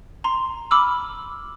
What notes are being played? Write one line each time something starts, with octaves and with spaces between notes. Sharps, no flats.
A#5 C6
B5 D6 E6 F6